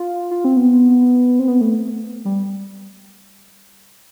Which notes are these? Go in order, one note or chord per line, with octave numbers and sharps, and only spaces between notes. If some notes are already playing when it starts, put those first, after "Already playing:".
Already playing: F4
F4
C4
B3
C4
B3
A3
G3